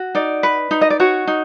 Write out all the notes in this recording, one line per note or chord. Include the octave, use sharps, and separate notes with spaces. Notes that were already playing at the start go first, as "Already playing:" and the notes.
Already playing: F#4
D#4 D5
B4
D#4
D#5
D5
F#4 C#5
D#4